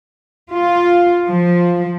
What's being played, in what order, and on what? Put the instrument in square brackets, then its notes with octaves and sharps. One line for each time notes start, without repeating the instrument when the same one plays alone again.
[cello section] F4
F3